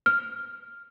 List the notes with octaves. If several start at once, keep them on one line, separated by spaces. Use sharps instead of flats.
F6